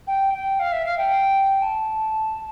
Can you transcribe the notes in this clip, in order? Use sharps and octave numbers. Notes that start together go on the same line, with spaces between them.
G5
G5
F5
E5
F5
G5
A5